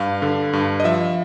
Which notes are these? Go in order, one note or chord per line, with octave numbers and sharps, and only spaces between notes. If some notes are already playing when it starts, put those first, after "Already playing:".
Already playing: G2 F5
D3
G2
D#5
F3 E5